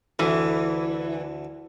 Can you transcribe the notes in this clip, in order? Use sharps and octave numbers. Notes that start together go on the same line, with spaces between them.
D2 D3 E3